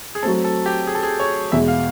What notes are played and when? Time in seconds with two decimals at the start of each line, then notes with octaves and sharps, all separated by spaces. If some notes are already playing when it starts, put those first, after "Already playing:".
0.15 G#4
0.23 F#3 A3 C4 A4
0.44 A4
0.66 G4
0.87 G#4
0.95 A4
1.03 G#4
1.20 C#5
1.52 E2 B2 G#3 E5
1.68 F5